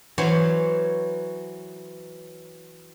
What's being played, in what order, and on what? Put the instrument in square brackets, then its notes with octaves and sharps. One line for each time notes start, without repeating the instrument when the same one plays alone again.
[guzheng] E3 F#3 C5 C#5 C6